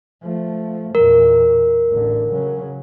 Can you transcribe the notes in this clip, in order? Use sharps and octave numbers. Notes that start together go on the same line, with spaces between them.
F3 A3
E2 A#2 A#4
A1 D3
C#3 F#3